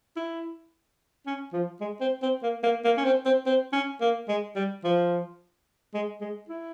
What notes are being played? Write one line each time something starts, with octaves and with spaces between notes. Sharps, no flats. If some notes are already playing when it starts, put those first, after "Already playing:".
E4
C#4
F3
G#3
C4
C4
A#3
A#3
A#3
C#4
C4
C4
C4
C#4
A#3
G#3
G3
F3
G#3
G#3
E4